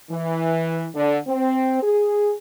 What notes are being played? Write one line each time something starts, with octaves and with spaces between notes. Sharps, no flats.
E3
D3
C4
G#4